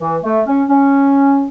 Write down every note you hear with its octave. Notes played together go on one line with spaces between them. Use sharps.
E3
A3
C#4
C#4